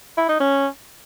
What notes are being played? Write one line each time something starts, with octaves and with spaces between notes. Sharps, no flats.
E4
D#4
C#4